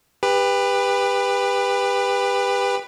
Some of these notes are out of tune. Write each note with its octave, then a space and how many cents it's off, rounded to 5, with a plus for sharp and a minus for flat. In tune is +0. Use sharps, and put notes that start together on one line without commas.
G4 +30 B4 +0